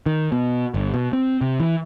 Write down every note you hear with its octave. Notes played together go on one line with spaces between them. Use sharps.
D#3
B2
G1
B2
C4
C3
E3